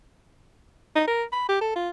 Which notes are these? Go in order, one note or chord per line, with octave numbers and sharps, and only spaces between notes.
D#4
A#4
B5
G4
A4
F4